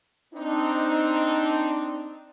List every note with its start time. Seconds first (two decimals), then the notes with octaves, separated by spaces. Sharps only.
0.34 C4 D4 D#4